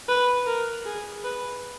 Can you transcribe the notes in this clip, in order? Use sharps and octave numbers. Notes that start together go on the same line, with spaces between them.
B4
A#4
G#4
B4